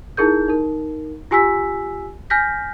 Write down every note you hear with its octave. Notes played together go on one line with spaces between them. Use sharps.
D#4 E4 G#4 A#4 G6
D#4 A#4
F4 G4 G#5 E6 B6
G#5 F6 G6 A#6 B6